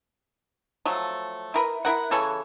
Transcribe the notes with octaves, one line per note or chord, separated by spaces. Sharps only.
F3 F#3 A3
E4 A#4 B4
E4 A#4 F#5
C#3 E3 A4 C#5